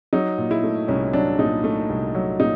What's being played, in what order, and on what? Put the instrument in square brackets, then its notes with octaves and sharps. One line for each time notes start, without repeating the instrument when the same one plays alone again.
[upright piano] F#3 D#4
A#2
E4
A3
C2 C#4
F#3 D4
A#2 D#4
A3
C2
F#3
A#2 D#4